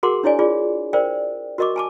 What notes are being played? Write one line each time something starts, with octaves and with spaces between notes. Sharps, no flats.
F#4 G#4 A#4 F#5 C6 D6
D4 E4 C#5 D5 G#5
F4 G#4 D5
A#4 C5 D5 G5
F#4 A#4 D#5 C#6 D6
G#5 A5 D6